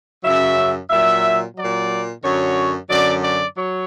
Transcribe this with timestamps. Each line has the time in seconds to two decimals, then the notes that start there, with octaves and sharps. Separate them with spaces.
0.24 F#2 C#3 F#3 E5
0.90 A#2 F#3 E5
1.56 A#2 F#3 D5
2.23 F#2 D3 F#3 C#5
2.89 F#2 D3 F#3 D5
3.22 D5
3.55 F#3 C#5